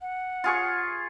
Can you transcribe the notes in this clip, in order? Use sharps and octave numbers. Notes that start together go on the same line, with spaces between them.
F#5
F4 G#4 C#6